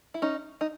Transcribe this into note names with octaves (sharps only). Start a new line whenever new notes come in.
E4
C#4 D#4
D#4